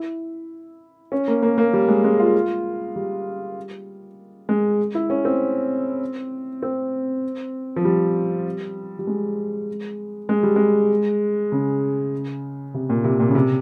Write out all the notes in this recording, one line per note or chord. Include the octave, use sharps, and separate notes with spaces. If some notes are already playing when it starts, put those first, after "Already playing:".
Already playing: E4
C#4
A#3
A#3
A#3
G3
G#3
G#3
F4
G3
G#3
E4
C#4
C4
C4
F3
G3
G3
G#3
G#3
G3
G#3
C#3
C3
A#2
C3
A#2
C#3
C3